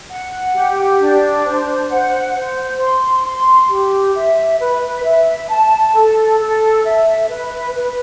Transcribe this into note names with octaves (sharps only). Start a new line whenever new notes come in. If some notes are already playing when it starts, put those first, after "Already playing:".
F#5
G4
D4
C5
F#5
C5
C6
C6
G4
E5
B4
E5
A5
A4
A4
E5
B4
B4